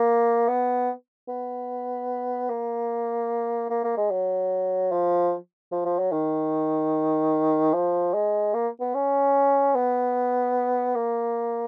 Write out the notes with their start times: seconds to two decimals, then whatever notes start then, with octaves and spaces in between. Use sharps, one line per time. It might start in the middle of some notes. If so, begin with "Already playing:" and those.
Already playing: A#3
0.48 B3
1.28 B3
2.49 A#3
3.70 A#3
3.84 A#3
3.97 G#3
4.11 F#3
4.92 F3
5.72 F3
5.85 F3
5.99 F#3
6.12 D#3
7.74 F3
8.14 G#3
8.54 A#3
8.80 B3
8.95 C#4
9.75 B3
10.96 A#3